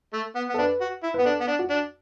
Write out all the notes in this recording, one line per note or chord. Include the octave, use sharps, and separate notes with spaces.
A3
B3
B3
A4
D4 B4
F#4
E4
B3 B4
D4 A4
B3
D4
F#4
D4